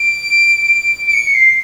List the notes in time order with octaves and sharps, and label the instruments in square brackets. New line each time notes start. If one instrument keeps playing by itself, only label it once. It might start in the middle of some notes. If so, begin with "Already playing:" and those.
Already playing: [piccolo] D7
D7
C#7
C7